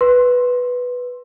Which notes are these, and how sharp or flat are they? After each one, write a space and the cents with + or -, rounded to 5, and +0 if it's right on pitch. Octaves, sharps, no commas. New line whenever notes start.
B4 +0 C6 +15